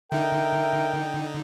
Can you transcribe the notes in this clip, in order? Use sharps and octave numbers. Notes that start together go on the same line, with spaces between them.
D3 D#4 A#4 E5 G5